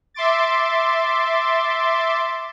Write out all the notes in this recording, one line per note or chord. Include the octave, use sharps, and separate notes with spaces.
E5 C6 D6 A6